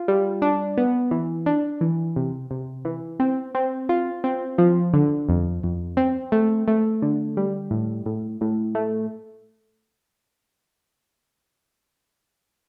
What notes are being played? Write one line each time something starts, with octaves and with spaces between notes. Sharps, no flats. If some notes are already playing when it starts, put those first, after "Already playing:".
Already playing: F4
G3
D4
B3
E3
D4
E3
C3
C3
E3
C4
C4
F4
C4
F3
D3
F2
F2
C4
A3
A3
D3
G3
A2
A2
A2
A3